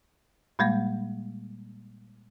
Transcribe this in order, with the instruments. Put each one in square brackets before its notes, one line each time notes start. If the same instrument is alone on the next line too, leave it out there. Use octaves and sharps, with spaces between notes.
[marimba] A#2 G3 G#3 A#3